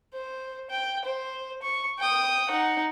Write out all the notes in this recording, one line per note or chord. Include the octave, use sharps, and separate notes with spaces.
C5
G5
C5
C#6
G5 D#6
D#4 F#5